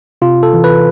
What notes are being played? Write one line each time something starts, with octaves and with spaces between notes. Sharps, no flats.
C3 F4
A4
E3
B4